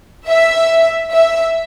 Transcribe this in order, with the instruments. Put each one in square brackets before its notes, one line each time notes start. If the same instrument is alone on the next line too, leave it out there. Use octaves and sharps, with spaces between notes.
[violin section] E5
E5